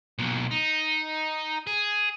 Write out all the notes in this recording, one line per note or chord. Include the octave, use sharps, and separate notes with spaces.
B1 A#2
D#4
G#4